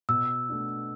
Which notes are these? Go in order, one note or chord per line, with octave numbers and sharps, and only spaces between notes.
B2 E6
A3 D4